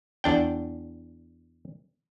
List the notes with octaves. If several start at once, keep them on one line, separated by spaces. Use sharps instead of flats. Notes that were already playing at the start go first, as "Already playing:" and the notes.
E2 D4 G5